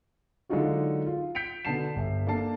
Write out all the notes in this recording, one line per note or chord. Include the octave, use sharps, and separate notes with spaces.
D3 F#3 G#3 D#4 F4 F#4
F4
G6 B6 C#7 D7 F7
B2 D3 B3 A5 C7 E7
G1 E5
A#3 D4 A4 A5 C7